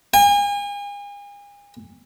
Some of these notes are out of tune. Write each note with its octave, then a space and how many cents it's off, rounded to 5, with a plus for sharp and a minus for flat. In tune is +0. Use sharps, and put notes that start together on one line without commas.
G#5 -40